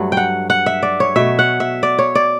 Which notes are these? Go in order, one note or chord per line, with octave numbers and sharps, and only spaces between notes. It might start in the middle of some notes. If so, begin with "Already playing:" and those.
Already playing: G2 F#3 A3
F#5 G5
F#5
E5
D5
C#5
B2 A3 E5
F#5
E5
D5
C#5
D5